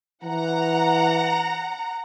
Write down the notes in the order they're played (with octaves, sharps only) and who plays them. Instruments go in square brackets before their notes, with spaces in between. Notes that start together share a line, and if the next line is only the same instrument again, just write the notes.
[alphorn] E3 [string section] F#5 A#5